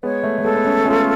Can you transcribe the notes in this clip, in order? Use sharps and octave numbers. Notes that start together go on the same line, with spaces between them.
G#3 B3 C#5
A3
A3
G#3 B3 A4
B3
A3 C#4
A3 C#4 F4